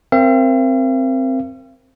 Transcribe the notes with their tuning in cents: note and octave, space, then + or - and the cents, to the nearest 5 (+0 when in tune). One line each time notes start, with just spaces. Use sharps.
C4 +5 A#4 +0 F5 -45